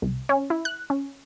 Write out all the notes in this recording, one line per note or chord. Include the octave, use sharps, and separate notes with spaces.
C2
C#4
E4
F#6
C#4